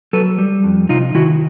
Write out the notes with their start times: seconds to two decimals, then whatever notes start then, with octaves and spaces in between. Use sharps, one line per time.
0.13 F#3 A4 B4
0.38 G3
0.64 F2
0.89 C3 D#4 F4
1.15 D#3 E4 F#4